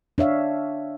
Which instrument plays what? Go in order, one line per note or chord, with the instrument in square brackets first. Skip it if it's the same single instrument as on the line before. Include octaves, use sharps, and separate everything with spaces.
[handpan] D4 C#5 E5 F5